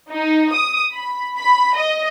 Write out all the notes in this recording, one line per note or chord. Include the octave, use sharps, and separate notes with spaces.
D#4
D#6
B5
B5
D#5